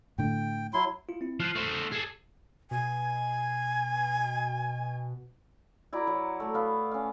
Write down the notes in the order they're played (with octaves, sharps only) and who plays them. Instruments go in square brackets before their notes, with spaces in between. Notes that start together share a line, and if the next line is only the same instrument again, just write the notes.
[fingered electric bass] A2 D3 [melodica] G5
[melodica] F#3 E4 C6
[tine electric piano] E4 F4
C4 E4
[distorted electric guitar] F3 [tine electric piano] F6 F#6 C7
[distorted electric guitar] A3 C5
G#4 A4
[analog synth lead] B2 [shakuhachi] G#5
[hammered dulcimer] E4 F#4 D5 A#5
F#3
A3 A4
B3 F5 B5
C#4 F5